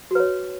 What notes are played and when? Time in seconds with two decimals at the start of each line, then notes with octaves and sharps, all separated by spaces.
0.11 F#4
0.15 B4
0.20 C#5